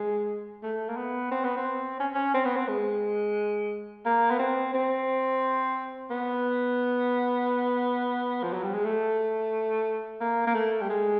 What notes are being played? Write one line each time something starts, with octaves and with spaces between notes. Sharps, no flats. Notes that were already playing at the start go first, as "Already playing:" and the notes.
Already playing: G#3
A3
A#3
B3
C4
B3
C4
C#4
C#4
C4
B3
C4
G#3
A#3
B3
C4
C4
B3
F3
F#3
G3
G#3
A3
A#3
A#3
A3
G3
G#3